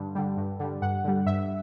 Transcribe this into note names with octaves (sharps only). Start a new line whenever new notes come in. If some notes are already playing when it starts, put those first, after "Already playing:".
Already playing: G2 D3 G3
D3 G3
G2
D3 G3
G2 F#5
D3 G3
G2 E5